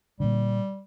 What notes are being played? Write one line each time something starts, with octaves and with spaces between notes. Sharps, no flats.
A#2 D3 G3